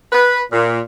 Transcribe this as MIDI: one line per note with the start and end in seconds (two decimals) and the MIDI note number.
0.12 0.40 71
0.51 0.78 46